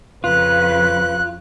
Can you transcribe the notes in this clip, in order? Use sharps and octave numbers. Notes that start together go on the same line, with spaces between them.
F2 C#3 F4 B4 F#6